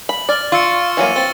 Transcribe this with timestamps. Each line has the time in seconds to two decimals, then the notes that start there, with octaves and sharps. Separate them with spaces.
0.09 B5 F#7
0.29 D5 F6 A6 F#7
0.52 F4 C#6 E6 C#7
0.97 E3 F#3 A#3 C#6 D#7
1.16 C4 A6 G7